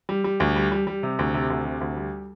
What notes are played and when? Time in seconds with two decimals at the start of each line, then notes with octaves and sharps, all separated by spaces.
0.09 G3
0.24 G3
0.40 D2
0.56 G3
0.72 G3
0.87 G3
1.03 C3
1.19 D2
1.34 C3
1.50 D2
1.65 C3
1.81 D2
1.97 G3